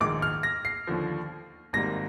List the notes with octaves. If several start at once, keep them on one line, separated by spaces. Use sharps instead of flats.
A#1 G#2 D#3 G#3 D6
F6
A#6
C7
D#2 D3 F3
G#1 G#2 G3 A#3 A#6